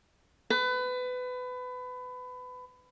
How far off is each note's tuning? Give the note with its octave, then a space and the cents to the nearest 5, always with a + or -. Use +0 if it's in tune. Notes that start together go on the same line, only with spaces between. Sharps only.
B4 +25